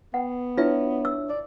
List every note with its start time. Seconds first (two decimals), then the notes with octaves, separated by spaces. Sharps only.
0.14 B3 F#5 G5
0.58 D4 E4 F4 B4 C#5 E5
1.05 E6
1.29 D5